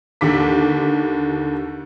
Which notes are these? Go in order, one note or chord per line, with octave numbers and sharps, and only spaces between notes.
D#2 D3 D6 B6